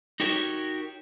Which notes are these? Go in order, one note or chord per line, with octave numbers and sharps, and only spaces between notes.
D#4 F#4 G4 A#4 C#5